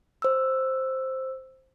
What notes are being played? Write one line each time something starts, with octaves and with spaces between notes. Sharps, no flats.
C5 E6